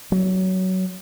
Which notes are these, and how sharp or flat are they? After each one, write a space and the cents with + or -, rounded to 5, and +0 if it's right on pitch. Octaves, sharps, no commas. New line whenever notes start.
F#3 +15